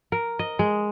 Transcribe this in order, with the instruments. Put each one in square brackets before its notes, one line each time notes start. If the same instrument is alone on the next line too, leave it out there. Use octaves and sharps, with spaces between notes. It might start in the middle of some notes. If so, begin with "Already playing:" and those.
[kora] A#4
D#5
G#3